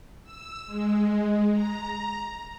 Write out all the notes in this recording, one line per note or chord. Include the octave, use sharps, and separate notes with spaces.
E6
G#3
A#5